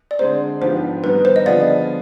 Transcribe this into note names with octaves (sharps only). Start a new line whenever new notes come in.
D5
D3 G#3 C4 C5
G#2 F3 B3 D4 G4 C5
D#3 G3 B3 D#4 B4
C5
D#5
D3 F3 B3 F4 G#4 D5